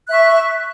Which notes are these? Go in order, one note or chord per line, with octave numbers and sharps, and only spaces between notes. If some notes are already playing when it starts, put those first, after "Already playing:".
E5 C#6 F#6